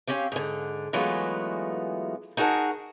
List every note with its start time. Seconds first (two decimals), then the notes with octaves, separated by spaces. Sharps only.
0.07 C4 C#4 G4 F5
0.32 G#2 D3
0.93 E3 F#3 G#3 A3 B3 F4
2.37 D#4 F#4 G#4 A#4 F#5 A5